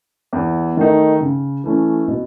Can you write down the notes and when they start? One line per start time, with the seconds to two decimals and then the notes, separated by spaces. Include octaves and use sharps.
0.33 E2
0.77 D#3 A3 D#4
1.21 C#3
1.64 E3 A3 C#4
2.08 B2